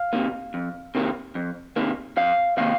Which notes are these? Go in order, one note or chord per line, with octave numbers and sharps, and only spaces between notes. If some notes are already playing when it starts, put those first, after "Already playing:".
Already playing: F5
C3 D#3 A#3
F2
C3 D#3 A#3
F2
C3 D#3 A#3
F2 F5
C3 D#3 A#3 F5